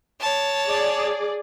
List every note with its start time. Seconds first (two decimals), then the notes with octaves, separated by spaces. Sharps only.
0.21 C#5 A5
0.67 G#4 D5